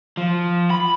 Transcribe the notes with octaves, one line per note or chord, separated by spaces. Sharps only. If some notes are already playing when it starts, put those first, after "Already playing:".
F3
B5